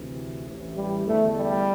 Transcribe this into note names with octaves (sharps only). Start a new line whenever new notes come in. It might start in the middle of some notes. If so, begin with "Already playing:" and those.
Already playing: D2 C3 E3
A1 A2 E3
G3
E2 D3 A3
G3